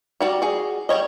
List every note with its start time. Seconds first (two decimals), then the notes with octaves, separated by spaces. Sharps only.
0.20 G3 F#4 D5
0.42 F#4 G#4
0.89 G3 B4 C#5 D#5